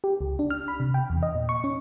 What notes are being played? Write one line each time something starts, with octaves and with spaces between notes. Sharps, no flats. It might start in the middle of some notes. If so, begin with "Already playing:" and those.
G4
C#2
D4
F6
B5
C3
G5
E2
D#5
A#2
C#6
C#4